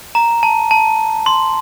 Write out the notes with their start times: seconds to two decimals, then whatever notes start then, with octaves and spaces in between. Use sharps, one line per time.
0.15 A#5
0.43 A5
0.71 A5
1.26 C6